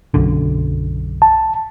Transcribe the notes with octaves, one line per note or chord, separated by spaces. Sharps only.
B1 F#2 D3
A5